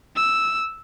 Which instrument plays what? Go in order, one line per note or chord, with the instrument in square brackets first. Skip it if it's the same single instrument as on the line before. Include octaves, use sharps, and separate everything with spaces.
[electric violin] E6